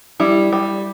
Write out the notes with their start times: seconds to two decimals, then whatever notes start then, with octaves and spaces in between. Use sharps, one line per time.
0.20 G3 E4
0.53 G3